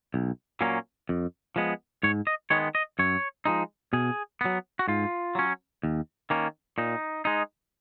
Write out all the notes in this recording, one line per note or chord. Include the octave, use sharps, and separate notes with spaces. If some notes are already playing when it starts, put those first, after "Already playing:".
B1
A#2 F#3 A#3 C#4
F2
F3 G#3 B3
G#2 C#5
D#5
D#3 G#3 B3 C#5
D#5
F#2 C#5
F3 G#3 D#4
B2 G#4
F#3 B3
F#4
G#2 F4
F#3 C#4
D#2
D#3 A#3 C#4
A#2 D#4
G#3 D#4